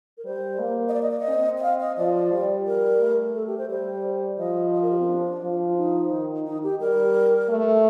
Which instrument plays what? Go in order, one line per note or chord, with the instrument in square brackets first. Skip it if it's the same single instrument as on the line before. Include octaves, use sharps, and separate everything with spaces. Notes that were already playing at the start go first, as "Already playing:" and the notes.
[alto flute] A#4
[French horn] G3 [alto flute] C5
[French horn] A#3
[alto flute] D#5
D5
D#5
D5
D#5
[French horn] C4
[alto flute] D#5
F5
D#5
[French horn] F3 [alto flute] D5
[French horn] G3
[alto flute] A#4
[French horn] A3
[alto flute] A4
G4
C5
[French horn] G3 [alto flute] C5
[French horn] F3 [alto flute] D#5
[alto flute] D#5
A#4
G4
C4
D4
[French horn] F3
[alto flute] F4
D#4
[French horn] D#3
[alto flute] D#4
G4
[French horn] G3 [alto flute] A#4
[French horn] A3